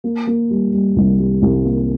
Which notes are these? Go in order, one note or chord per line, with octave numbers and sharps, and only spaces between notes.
A#3
A#3
G3
G3
C2
G3
C2
A#3